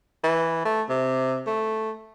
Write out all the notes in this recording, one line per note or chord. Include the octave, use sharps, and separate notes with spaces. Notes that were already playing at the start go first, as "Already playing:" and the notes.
E3
A3
C3
A3